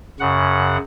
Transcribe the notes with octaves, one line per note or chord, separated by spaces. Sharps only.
F#2 C#3 F#5